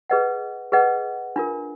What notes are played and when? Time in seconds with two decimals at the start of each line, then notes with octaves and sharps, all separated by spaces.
0.10 G#4 B4 D#5 F#5
0.72 G#4 B4 D#5 F#5
1.36 D4 F4 A#4